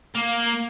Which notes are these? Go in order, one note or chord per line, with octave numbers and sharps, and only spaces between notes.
A#3